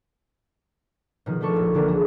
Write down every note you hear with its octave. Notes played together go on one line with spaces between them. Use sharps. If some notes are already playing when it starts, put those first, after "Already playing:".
B2 D#3 F3
A3 D4 A4 C#6
A#1
D3 E3 A#3 D4 A#4
G#4 A4